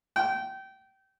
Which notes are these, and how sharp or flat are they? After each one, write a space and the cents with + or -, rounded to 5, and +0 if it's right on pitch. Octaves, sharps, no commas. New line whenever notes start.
G5 -25